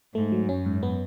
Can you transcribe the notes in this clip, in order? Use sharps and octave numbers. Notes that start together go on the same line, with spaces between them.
G#2 A3
F#3
F#2 C#4
G#2
B3